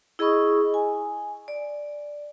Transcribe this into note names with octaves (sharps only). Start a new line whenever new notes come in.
E4 G#4 D#5 B5 C#6 D#6
G#5
D5